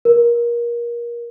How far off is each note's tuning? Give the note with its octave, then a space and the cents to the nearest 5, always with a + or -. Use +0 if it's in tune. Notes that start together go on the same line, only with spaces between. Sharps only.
A#4 +25